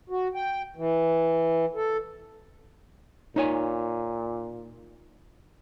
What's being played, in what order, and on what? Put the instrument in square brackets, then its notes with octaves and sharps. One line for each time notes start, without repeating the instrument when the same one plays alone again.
[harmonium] F#4
G5
E3
A4
[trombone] A#2 [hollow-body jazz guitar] D#4 C#5 G#5